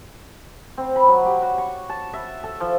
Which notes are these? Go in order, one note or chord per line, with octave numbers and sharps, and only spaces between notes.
C4
B5
F#3
G4
F#4
C#6
A5
E5
A4
F3